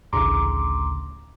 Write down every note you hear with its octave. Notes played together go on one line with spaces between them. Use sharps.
A1 D2 C#3 A#5 C6 D6